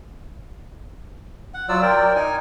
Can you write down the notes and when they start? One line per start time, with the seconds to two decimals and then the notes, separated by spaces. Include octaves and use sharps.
1.54 F#5
1.69 F#3 F4 D5 E6
1.82 A#4 D5 G5
2.15 D#4 G#5